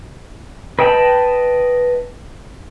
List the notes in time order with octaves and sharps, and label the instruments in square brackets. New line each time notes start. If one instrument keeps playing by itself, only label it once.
[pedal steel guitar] B4 D#5 G5 A5 B5